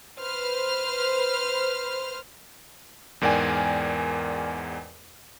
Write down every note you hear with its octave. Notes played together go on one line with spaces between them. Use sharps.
B4 C5 F6
E2 G#2 A#4 D5 G5 G#5